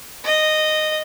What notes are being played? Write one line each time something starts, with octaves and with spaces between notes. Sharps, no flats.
D#5